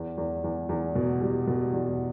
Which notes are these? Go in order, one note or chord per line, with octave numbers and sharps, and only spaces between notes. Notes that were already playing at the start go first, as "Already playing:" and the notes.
Already playing: E2
E2
E2
E2
B2
G3
B2
E2